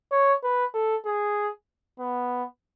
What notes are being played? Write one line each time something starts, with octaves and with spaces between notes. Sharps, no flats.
C#5
B4
A4
G#4
B3